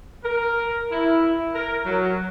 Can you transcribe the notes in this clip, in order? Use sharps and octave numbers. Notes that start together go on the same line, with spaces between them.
A#4
E4
A#4
F#3